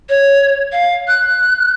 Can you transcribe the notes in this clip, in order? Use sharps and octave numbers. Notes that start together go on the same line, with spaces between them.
C#5
F5
F#6